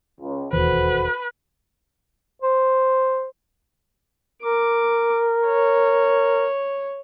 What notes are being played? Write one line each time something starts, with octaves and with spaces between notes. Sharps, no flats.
C#2
E1 D#2 E3 F#4 A4 B4 C5
C5
A#4 D6
C#5